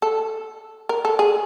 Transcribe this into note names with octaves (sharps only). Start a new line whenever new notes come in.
A4
A#4
A4
G#4